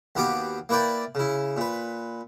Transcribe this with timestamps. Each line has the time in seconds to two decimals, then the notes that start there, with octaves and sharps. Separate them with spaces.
0.15 D#2 B3 F#4 G4 F5 D6
0.69 A#3 E4 B4 D5 G5
1.15 C#3 E4
1.57 A#2 B4